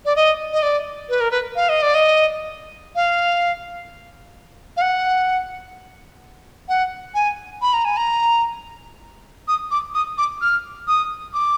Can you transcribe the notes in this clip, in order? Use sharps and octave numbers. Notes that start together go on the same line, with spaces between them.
D5
D#5
D#5
D5
B4
A#4
B4
F5
D#5
D5
D#5
F5
F5
F#5
F#5
G#5
B5
A#5
G#5
A#5
D#6
D6
D#6
D6
F6
D#6
D6